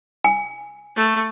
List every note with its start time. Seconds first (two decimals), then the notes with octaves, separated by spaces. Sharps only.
0.24 G#5
0.96 A3